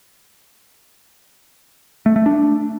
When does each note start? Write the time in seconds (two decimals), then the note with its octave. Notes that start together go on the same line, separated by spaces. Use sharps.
2.06 A3
2.16 A3
2.26 D4